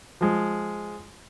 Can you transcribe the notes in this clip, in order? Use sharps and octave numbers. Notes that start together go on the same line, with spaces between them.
F3 G#3